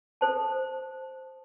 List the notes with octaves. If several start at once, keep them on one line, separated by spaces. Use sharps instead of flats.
A4 C5 A5